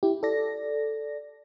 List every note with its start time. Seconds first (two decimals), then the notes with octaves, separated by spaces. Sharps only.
0.03 E4 G4
0.23 A4 D5 A#6